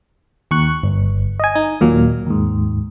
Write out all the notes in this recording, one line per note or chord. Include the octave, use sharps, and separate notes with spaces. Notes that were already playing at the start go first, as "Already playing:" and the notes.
D#2 C#6 F#6
G1
D#5 G#5
D#4
D#2 A#2 F#3 A#3
D#2 G#2